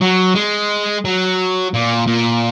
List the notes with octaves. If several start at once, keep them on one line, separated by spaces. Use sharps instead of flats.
F#3
G#3
F#3
A#2
A#2